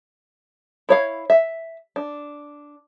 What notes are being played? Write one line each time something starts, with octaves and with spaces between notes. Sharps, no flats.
E4 C#5 F5
E5
D4